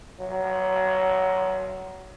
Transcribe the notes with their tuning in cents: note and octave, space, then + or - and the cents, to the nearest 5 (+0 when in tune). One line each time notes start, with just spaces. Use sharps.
F#3 +20